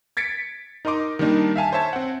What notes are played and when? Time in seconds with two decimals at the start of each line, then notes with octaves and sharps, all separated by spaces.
0.17 G#6 A6 B6 C#7 D7
0.85 D#4 A#4 D#5 C6 D6
1.19 D#3 G3 A#3 D4 D#4
1.56 E5 F5 G#5 A5
1.72 C5 C#5 E5 A5 G#6
1.93 C4 F#5